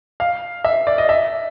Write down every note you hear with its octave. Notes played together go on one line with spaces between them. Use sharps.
F5
E5
D5
D#5
E5